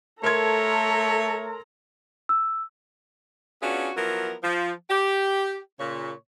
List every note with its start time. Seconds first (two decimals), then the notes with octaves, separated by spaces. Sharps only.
0.23 A3 A4 A#4 C#5 A#5 C6 G#6
2.29 E6
3.62 B3 C#4 D4 F4 F#4 G#4
3.97 F3 F#3 B3 E4 A#4
4.43 F3
4.90 G4
5.80 A#2 C#3 C#5